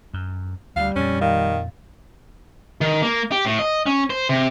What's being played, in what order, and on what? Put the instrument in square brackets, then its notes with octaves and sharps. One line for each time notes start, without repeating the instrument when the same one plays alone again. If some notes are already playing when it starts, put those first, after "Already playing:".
[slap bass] F#2
[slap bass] D2 [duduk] G3 [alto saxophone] F5
[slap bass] F2 A#2 [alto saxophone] C#4
[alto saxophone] D#3 [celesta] F5
[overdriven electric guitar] D#3
A#3
G4
A2
D#5
C#4
C5
C3